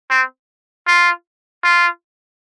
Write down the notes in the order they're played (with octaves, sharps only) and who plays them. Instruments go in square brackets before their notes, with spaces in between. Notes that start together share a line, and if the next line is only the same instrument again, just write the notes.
[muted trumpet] C4
F4
F4